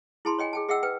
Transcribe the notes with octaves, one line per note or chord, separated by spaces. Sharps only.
E4 G#4 A5 B5 C6
C#5 D#5 G5 G#5
G#4 G5 A5
G#4 D#5 E5 F#5 G5 E6
B4 G5